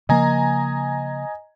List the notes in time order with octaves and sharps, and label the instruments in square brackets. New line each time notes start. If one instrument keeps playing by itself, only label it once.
[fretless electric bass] C#3 F3 A#3 [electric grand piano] D#5 G#5 A#5